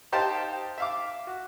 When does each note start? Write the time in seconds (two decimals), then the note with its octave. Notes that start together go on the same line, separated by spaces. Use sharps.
0.12 D#4 G4 C5 F5 G5 A5
0.78 E5 F5 D6
1.27 F#4